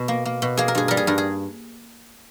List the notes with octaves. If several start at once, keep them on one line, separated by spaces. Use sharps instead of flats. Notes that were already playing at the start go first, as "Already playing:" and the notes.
Already playing: B2
A#3
A#3
B2
A#3 G#4
A#4
G2 G#4
G3 A#4
G#4
G2 A#4
G#4